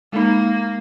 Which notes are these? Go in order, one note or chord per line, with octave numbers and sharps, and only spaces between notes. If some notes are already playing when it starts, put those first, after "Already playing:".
G#3 A#3 D#4